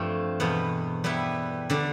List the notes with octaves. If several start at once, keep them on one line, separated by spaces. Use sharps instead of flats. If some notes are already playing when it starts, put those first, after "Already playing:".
Already playing: G2 F3 A3 C4 F4
E2 B2 B3
G3 B3 E4 B4
D3 G3 D4